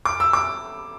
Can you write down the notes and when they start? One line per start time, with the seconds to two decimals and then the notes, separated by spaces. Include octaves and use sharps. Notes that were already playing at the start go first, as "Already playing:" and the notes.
0.05 D6
0.20 E6
0.33 D6